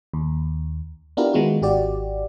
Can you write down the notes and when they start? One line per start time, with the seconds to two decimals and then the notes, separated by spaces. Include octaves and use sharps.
0.14 D#2
1.17 B3 D4 E4 F4 G4 A#4
1.34 D#3 G#3 B3 F4 F#4
1.62 G#1 F#4 G4 D5